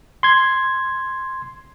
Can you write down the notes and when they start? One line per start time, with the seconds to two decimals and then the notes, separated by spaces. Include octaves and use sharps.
0.23 C6 G#6